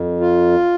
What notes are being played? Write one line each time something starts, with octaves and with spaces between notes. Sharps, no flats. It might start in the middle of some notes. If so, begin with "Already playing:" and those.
Already playing: F2
F4